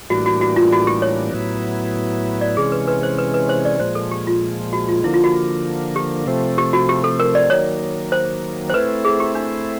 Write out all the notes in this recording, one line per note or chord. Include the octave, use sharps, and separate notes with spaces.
A2 E3 G3 A#3 D4 F#4
F#4
F#4
F4
F#4
G4
C#5
A2 F#3 B3 E4
D5
C3 E3 G#3 C#4 G#4
B4
B4
C5
B4
B4
C5
D5
A#2 F3 G#3 C5
A4
G4
F4
F#4
F4
D3 F3 A#3 E4
F4
F#4
G4
C3 F3 A3 C4
G4
F#4
G4
A4
A#4
D5
D#3 F#3 A#3 C#5
C5
C5
A3 C4 E4 B4
G#4
G4
D4